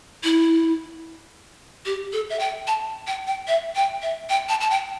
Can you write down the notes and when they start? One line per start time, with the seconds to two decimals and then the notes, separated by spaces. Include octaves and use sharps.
0.24 E4
1.85 G4
2.13 A4
2.30 E5
2.39 G5
2.67 A5
3.07 G5
3.27 G5
3.47 E5
3.75 G5
4.02 E5
4.29 G5
4.49 A5
4.61 A5
4.70 G5